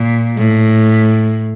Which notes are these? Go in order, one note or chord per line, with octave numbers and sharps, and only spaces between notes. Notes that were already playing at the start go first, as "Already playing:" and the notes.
Already playing: A#2
A2